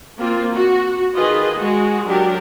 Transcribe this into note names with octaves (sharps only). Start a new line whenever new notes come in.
A#3 C4 F4
F#4
D#3 F4 G#4 B4 D#5
G#3 F#4
F#3 D4 G4 A#4